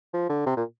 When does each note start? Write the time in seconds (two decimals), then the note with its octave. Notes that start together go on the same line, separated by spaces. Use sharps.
0.14 F3
0.29 D3
0.46 C3
0.57 A#2